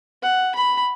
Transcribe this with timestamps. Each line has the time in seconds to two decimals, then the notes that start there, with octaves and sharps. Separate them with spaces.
0.23 F#5
0.55 B5